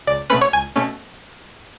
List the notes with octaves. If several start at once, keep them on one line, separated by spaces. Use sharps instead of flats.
C#2 D5
B2 A3 C#4 B4 B5
C#5 C#6
C#2 G#5 G#6
B2 A3 C#4